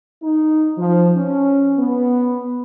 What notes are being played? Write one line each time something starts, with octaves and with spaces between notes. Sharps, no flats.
D#4
F3
C#4
B3